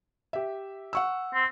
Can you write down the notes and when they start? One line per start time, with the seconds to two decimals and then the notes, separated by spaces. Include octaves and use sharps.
0.33 G4 E5
0.93 F#5 C#6 E6
1.34 C4